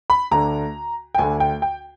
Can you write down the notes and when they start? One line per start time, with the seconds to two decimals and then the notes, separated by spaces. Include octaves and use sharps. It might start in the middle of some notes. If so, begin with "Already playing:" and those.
0.10 B5
0.31 D2 D3 A#5
1.15 G5
1.18 D2 D3 G#5
1.40 G5
1.62 G5